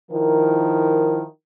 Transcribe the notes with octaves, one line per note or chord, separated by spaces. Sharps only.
D#3 F3 E4 A#4